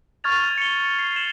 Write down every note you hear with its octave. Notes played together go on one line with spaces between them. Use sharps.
C#6 F6 G#6 A6 F7
C#7 G7
C7
G#6 E7 F#7